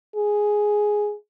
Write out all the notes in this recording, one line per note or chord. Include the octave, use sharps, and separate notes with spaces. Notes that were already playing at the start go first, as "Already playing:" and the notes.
G#4